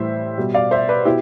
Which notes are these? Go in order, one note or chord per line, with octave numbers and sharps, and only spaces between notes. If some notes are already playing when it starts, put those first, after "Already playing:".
Already playing: A2 E3 G3 C5 E5
B2 G3
D5 F5
C5 E5
B4 D5
B2 E4 G4